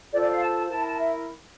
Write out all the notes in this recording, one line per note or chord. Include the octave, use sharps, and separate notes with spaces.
F4 A4 C5 D5
D5
F5
A5
E4 A#4 A5
A5
E5